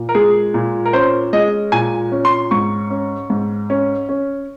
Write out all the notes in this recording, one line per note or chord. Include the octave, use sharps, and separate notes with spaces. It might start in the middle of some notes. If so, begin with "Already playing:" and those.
Already playing: A#2
A#4
G#3 G#4
A#2
A#4
C#4 C5
G#3 D#5
A#2 G#5
C#4
C6
G#2 C#6
C#4
G#2
C#4
C#4